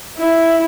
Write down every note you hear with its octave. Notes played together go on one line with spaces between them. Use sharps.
E4